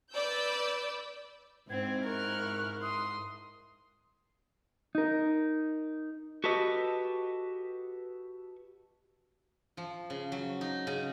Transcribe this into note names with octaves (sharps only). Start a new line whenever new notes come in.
B4 D5 E6 G6
G#2 C4 E4 G#6
A#4 C#6 F6 F#6
C6 D#6
D#4 A#4
F#4 G4 A4 B4 D#5
F3
C#3
F#3
D#4
C#3